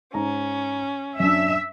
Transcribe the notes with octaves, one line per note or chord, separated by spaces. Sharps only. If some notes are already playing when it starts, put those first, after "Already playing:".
G#2 C#4 A#5
F#2 D4 E5